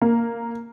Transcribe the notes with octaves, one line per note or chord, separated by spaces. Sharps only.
A#3